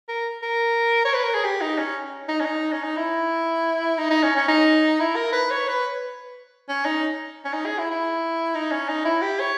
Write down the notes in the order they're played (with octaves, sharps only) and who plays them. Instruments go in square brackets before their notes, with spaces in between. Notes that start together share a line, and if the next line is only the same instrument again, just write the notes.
[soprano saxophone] A#4
A#4
C#5
B4
A#4
G#4
G4
D#4
C#4
D#4
C#4
D#4
C#4
D#4
E4
D#4
D#4
C#4
C#4
D#4
E4
A#4
B4
C#5
B4
C#4
D#4
C#4
D#4
G#4
E4
E4
D#4
C#4
D#4
E4
G4
C#5